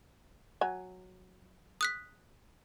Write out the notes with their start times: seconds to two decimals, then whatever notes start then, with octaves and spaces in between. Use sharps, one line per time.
0.61 F#3 G#5
1.81 D#6 F#6 B6